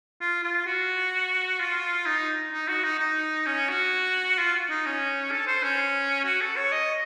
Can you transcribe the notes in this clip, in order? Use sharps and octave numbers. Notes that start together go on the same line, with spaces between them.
F4
F4
F#4
F4
D#4
D#4
F#4
D#4
D#4
C#4
F#4
F4
D#4
C#4
A4
C5
C#4
F#4
A4
C#5
D#5